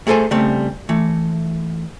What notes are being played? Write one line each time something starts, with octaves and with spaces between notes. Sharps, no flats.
A3 G#4 A4 B4 C5 G#5
C#3 G3 A3 C4
E3 A3